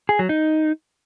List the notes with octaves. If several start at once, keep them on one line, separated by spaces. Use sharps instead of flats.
G#4
F#3
D#4